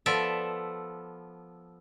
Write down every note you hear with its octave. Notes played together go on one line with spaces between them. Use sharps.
F3 B3 A4 D5 E5